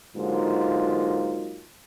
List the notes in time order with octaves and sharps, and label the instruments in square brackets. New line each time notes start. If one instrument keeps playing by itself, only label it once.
[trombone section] G#2 D3 F#3 A#3 D#4 F4